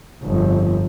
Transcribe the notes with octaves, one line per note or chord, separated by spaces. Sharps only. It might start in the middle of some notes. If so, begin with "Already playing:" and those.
G1 F2